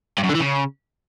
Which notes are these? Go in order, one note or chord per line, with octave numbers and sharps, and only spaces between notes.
G2
F#2
D3
E3
C#3